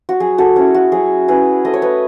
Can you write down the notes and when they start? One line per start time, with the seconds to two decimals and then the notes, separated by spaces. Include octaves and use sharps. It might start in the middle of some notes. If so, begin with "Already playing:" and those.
0.09 F#4
0.20 F#3 G#4
0.38 F#4 A4
0.56 C#4 E4 G#4
0.74 F#4
0.92 F#3 G#4
1.28 C#4 E4 G#4 B4
1.65 A3 D#5
1.74 C#5
1.82 B4 D#5